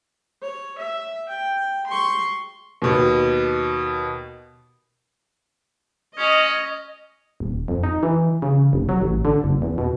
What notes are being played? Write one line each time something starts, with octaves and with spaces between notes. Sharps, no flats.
C#5
E5
G5
C6 C#6
D#2 B2
C#4 D#5
D#1
F2
D#4
E3
C#3
F1
F#3
A1
D3
F#1
E2
B2